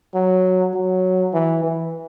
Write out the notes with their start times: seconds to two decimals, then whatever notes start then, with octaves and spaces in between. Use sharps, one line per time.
0.14 F#3
0.74 F#3
1.33 E3
1.63 E3